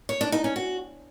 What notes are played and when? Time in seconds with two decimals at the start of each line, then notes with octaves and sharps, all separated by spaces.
0.09 C#5
0.21 D4
0.32 D#4
0.44 C#4
0.56 F#4